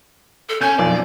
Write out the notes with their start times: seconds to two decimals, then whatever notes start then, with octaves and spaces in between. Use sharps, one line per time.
0.49 A4
0.61 C#4 G#5 G6
0.79 B1 F2 D5